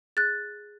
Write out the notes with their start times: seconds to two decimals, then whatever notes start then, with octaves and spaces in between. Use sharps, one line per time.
0.17 G#4 F#6 A6